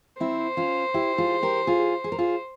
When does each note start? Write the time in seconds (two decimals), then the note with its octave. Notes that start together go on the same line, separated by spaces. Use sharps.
0.20 C4 E4 C5
0.57 C#4 F4
0.94 E4 G4
1.18 F4 G#4
1.43 G4 A#4
1.67 F4 G#4
2.04 G#4
2.12 A#4
2.18 F4 G#4